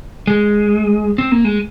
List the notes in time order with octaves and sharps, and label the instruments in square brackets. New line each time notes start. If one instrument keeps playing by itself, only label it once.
[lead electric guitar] G#3
C4
A#3
G#3